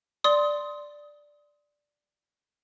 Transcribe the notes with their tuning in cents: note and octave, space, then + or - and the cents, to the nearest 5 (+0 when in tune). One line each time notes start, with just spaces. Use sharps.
D5 +0 C6 -5 D#6 +20